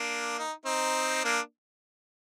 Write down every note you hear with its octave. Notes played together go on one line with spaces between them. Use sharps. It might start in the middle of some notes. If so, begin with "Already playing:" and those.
Already playing: A#3 D4
D#4
C4 D#4
A#3 D4